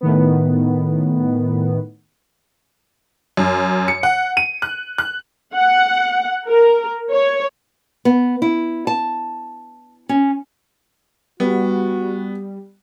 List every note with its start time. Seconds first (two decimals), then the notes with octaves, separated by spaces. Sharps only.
0.01 A2 D#3 B3
3.37 F#2
3.88 C#7
4.03 F#5
4.37 D#7
4.62 F#6
4.98 F#6
5.56 F#5
6.48 A#4
7.12 C#5
8.05 B3
8.42 E4
8.87 A5
10.09 C#4
11.40 G3 B3 F#4